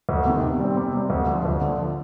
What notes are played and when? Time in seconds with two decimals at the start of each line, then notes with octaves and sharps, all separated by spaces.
0.09 D2
0.26 C3 D#3
0.43 C3
0.59 G3 C4
0.77 C3
0.94 G3 C4
1.10 D2
1.27 D3 F3
1.45 D2
1.61 D3 F3